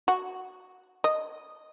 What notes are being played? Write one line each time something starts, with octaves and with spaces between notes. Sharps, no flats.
F#4
D#5